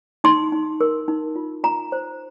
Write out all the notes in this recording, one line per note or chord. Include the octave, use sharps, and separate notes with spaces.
D#4 C6
D#4
A#4
D#4
F4
F4 A#5
C5